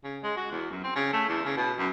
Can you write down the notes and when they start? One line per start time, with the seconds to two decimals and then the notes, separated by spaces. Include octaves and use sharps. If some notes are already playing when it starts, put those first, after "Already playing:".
0.04 C#3
0.23 G#3
0.37 F#4
0.51 E2
0.70 F#2
0.84 C4
0.95 C#3
1.12 A3
1.28 E2
1.45 C#3
1.57 B2
1.78 F#2